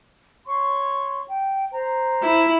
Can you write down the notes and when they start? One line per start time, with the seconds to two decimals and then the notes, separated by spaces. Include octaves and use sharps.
0.47 C#5 C6 C#6
1.29 G5
1.72 C5 A#5
2.23 E4